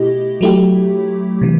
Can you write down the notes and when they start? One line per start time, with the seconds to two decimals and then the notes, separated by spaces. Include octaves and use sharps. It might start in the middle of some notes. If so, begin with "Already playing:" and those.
Already playing: B2 A3 E4 G4 D#5
0.41 F#3 A3 E4 G4
1.41 C3 E3